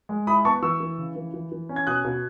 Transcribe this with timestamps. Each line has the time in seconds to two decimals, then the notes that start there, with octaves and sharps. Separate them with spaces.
0.09 G#3
0.27 E4 B5 D#6
0.45 B3 A5 C#6
0.62 E3 C#6 E6
0.80 E3
0.98 C#3
1.16 E3
1.34 E3
1.52 E3
1.69 C#4
1.76 G#6
1.87 B2 D#6 F#6
2.05 B2